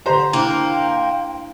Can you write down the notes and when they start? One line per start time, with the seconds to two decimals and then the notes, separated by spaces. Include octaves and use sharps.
0.06 D3 G4 C5 A#5
0.33 A#3 D4 E4 G5